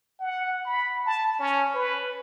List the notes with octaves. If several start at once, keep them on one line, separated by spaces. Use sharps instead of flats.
F#5
B5
A5
C#4
B4